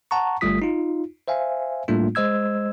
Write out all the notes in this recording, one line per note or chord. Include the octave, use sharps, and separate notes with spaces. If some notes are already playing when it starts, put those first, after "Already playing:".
F#5 A5 A#5 C#6
G1 G3 A3 F4 D#6 B6
D#4 F4
C5 E5 F5 G#5
A2 G3 A3 A#3 D4 F4
G#3 C5 D#5 E6 G#6